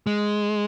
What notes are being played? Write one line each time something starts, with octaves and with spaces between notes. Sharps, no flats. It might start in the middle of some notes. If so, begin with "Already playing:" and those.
G#3